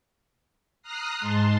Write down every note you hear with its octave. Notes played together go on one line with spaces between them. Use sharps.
A#5 D#6 F6 F#6 A#6 C7
G#2 G#3 A5 C6